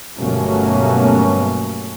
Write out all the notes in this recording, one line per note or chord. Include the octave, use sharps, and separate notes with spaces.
G1 B2 F#3 A3 A#3 C#4